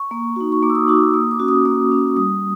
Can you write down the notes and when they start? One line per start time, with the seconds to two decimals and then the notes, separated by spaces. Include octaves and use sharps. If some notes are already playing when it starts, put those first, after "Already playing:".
Already playing: C#6
0.11 A#3
0.36 D#4 F#4
0.52 C#6
0.62 A#3 D6
0.70 E6
0.75 D#6
0.88 D#4 F#4 D6
1.03 E6
1.14 A#3 D#6
1.31 D6
1.40 C#4 F#4
1.48 D#6
1.65 A#3 D#6
1.91 C#4 F#4
2.17 G3 D#6